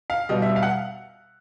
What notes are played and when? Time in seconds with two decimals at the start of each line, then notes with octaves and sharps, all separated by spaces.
0.10 F5
0.29 B2 G3 D#5
0.42 E5
0.56 F5
0.63 F#5